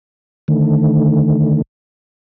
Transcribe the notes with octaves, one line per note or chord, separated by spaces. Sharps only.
D3 D#3 A3